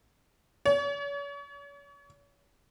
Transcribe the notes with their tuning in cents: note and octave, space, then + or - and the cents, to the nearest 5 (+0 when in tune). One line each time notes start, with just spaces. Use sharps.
C#5 +40